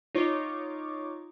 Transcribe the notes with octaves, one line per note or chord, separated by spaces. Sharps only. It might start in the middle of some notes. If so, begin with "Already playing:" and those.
D#4 F4 C#5 C#6 D6